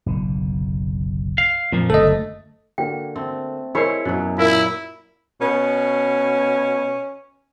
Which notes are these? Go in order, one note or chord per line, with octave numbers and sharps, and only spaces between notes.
F#1 B1 D3
F5
F2 A#2 F3 A#3
F#1 D2 A3 A4 D#5
D3 A#3 F#4 G5
A3 C4
E4 G#4 A#4 C5 C#5 D#5 G#5 C7
F#2 B2 F#3
A#2 E4 F4 A#4
B2 C#4